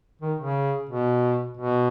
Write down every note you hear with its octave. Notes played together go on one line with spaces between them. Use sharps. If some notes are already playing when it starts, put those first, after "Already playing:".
D#3
C#3
B2
B2